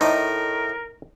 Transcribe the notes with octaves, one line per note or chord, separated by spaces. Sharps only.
A2 A3 D#4 A#4 C5 D5 D#5